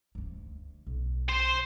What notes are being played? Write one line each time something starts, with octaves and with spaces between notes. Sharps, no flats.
D2 D3
B1
C5